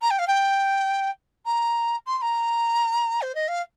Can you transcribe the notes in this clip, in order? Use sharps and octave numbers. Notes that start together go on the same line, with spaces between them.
A#5
G5
F5
G5
A#5
C6
C6
A#5
C5
D#5
F5